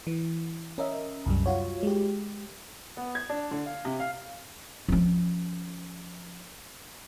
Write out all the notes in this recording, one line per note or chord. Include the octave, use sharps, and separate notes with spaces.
E3
C#4 A#4 D#5 E5
C2 F#2 G3
F4 F#4 C#5
G#3 G4
B3
G#6
D4
D3
F5
C3
F5
F3 C#4